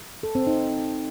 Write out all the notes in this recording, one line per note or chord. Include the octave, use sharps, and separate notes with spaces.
A4
C4
D#4